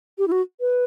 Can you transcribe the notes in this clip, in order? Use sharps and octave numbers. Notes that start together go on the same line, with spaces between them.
G4
E4
F#4
B4